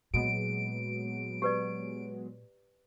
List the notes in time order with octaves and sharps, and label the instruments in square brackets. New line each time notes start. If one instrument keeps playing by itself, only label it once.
[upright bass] A#2 [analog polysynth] F#3 G#3 B3 [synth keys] D7
[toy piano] G4 B4 D5